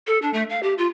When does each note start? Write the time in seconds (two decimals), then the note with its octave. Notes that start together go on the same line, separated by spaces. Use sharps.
0.07 A4
0.22 D4
0.34 A3
0.50 F5
0.63 G4
0.78 F4